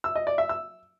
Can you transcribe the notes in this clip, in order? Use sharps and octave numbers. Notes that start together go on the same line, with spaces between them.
E6
D#5
D5
E5
E6